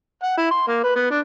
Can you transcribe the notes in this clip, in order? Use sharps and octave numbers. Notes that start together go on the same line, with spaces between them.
F#5
E4
C6
A#3
B4
B3
D4